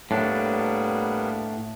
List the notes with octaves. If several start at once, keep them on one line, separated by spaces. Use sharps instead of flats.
A2 G3 A#3 B3 D4